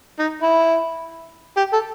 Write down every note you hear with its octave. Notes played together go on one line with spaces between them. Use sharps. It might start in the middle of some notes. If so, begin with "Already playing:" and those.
D#4
E4
G4
A4